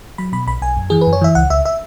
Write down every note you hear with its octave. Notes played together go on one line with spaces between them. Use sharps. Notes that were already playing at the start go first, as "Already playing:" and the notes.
F#3 B5
B2 B5
B1 B5
B1 G#5
F#2
E3 G#4
B4
F#2
C#5
E3 E5
C#2 F#5
C#2 E5
E5